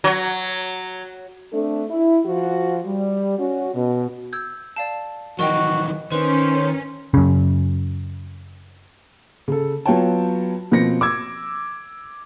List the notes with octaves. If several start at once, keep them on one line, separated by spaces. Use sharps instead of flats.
F#3
A3 C4 D4 A4
E4
F3 F#4
G3
C#4 F#4
B2
E6 G6 G#6
D5 F5 A5
D#3 E3 F#3 F#4 A#4 D#5 G5
D#3 C#4 B4 C5
F#2 C#3
C#3 A4
F#3 B3 F4 C#5 G5 A5
B2 F3 A#3 C4 A#6 C#7
D6 E6 G#6